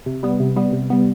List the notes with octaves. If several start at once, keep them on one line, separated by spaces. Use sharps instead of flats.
C3
G3 B3
C3
G3 B3
C3
G3 B3